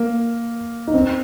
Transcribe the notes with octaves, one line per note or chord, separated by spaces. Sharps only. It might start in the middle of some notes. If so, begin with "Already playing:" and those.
Already playing: A#3
D#4
C4